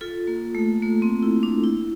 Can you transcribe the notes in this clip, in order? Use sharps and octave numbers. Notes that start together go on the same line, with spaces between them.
F4 A4
A#3
A3
A#3
C4
E4
D4
E4